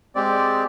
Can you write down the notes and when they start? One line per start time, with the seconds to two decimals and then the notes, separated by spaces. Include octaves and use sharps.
0.15 G#3 C4 G4 D5